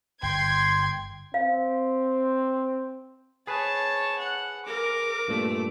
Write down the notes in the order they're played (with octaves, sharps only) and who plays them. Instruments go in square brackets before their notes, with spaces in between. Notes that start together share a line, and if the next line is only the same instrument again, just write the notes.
[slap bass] G1 [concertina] G5 [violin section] C6 G#6
[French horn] C4 [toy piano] F5
[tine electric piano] G#4 B4 [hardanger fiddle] C#5 A5
[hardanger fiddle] F#5
[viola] A#4 [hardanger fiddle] D6
[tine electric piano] G2 A#2 [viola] A3